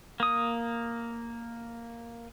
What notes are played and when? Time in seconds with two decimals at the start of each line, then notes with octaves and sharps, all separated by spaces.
0.20 A#3 D#6